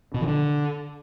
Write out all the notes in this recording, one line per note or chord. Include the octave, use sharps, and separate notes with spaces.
B2
E3
D3